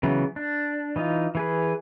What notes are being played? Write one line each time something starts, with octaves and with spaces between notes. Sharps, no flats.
C#3 E3 F#3 B3
D4
E3 D#4 F4
E3 G#4 B4